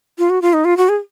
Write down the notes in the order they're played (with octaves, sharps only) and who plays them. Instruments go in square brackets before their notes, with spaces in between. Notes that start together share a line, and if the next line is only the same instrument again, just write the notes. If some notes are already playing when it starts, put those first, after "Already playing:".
[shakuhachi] F4
F#4
F4
D#4
F4
F#4
G#4